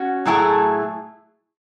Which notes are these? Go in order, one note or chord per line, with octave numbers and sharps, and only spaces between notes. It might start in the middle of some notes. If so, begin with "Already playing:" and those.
Already playing: C#4 F#4
A2 F#3 A3 E4 G#4